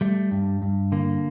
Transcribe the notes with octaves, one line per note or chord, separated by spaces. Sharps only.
G3 A3
G2
G2
D3 A#3